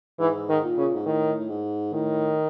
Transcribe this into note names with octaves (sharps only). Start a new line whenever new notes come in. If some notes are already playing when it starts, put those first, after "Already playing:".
G#2 E3
D#3
A#2
C#3
G#2
A2 D#3
A2
G#2
A2 D#3